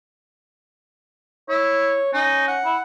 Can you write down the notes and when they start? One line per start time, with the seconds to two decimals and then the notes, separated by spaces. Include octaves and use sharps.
1.49 E4 C#5
2.13 C#4 D#4
2.48 F#5
2.65 E4